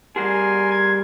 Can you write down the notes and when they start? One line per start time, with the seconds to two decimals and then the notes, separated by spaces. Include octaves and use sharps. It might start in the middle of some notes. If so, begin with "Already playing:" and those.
0.16 G3 F#4 G#4 A#4 G#5 C6
0.71 G#6